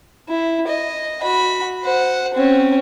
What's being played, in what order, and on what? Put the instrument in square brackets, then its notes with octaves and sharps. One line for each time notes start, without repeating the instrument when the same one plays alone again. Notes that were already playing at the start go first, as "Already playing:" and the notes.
[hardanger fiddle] E4
D#5
F#4 B5
C5 F#5
C4 C#4